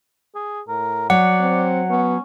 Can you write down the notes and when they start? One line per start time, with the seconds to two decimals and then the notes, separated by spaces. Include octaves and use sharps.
0.35 G#4
0.68 A2 A#4
1.10 F#3 D5 F#5
1.40 C4
1.90 B3 C#4